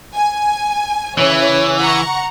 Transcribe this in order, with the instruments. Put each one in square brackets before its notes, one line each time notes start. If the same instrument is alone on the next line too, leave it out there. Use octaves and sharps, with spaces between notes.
[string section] G#5
[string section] C#3 C#5 [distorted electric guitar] E3
[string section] F#5 A#5 C#6